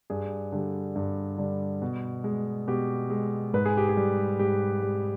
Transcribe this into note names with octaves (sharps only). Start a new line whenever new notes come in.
G2 G#4
D3 G3
G2
D3 G3
B2
G#3
B2 G4
G#3
G#2 B4
G#4
G4
G#4
G3
G#2 G4
G3